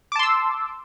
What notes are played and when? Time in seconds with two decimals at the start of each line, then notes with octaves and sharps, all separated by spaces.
0.12 D6
0.16 A5
0.19 C6
0.23 E6